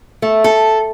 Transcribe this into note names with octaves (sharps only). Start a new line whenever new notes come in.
A3
A4